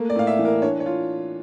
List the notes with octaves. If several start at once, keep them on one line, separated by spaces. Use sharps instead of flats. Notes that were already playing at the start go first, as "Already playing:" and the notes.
Already playing: A3 A#3
D5
A2 F5
E5
E3
A#4
D4 C#5
C#5
F4